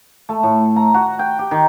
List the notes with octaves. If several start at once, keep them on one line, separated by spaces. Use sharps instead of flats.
A3
A2
A#5
F#4
G5
G4
D#3